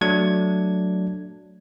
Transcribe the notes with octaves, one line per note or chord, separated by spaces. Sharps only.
F#3 A3 D4 G#6